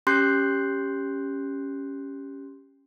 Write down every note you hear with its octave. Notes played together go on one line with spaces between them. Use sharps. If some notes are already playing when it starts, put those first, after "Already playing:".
C#4 G4 C6 F#6 G6 C7